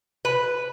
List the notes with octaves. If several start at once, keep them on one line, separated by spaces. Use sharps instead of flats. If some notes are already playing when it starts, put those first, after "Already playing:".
B4